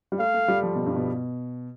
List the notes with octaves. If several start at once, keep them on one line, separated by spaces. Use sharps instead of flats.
G3
A3 F5
A3
G3
F3
B2
G2
B2